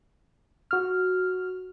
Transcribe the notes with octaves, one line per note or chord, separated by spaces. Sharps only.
F#4 F6